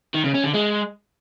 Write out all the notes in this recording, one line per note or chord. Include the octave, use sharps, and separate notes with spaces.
D#3
C#3
C#4
D3
G#3